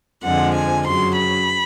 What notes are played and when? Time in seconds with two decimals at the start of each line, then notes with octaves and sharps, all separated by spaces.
0.23 F2 D3 F3 G#3 F#5
0.54 G#5
0.85 F#2 C#3 F#3 C6
1.16 B5